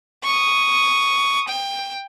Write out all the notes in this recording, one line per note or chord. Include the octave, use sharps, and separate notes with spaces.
C#6 D#6
G5